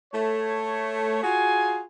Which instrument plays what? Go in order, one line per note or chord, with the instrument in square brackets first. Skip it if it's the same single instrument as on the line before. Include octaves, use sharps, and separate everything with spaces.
[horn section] A3 C#5
F4 F#4 G#4 G#5